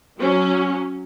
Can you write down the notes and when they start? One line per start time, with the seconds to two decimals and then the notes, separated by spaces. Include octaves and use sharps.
0.20 F#3 C#4